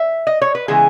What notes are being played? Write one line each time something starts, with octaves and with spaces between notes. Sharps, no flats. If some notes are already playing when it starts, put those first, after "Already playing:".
Already playing: E5
D#5
C#5
B4
C#3 E3 G#3 B3 G#4